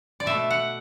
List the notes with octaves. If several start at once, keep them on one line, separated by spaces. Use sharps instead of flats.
D5
B2 A3 E5
F#5